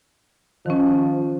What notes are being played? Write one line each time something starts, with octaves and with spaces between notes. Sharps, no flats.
D#3 F3 C#4